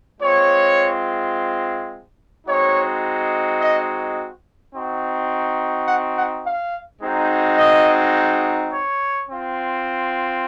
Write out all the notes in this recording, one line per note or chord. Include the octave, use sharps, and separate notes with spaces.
G#3 C4 F4 C#5
G#3 C4 D#4 F#4 C#5
D#5
C4 D#4 F#4
F#5
F#5
F5
G#3 C4 D#4 F#4
D#5
C#5
C4 F4